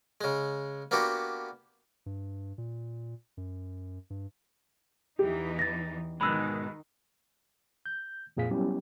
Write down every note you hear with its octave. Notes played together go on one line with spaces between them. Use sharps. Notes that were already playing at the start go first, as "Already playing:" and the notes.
C#3 G#3
A#3 B3 D4 F#4 G4
G2
A#2
F#2
G2
E2 E3 D#4 G4
A6 A#6
G#2 B2 D#3 G#3 B5 E6 F#6
G6
F2 A#2 G#4 F5 B6
F#3 G3 B3 C#4 E4 G4